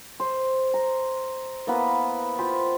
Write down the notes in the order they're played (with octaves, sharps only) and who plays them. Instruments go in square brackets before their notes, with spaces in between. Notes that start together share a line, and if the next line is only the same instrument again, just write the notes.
[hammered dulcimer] C5
A#5
A#3 B3 E4 B4
F4 G4 B4 C5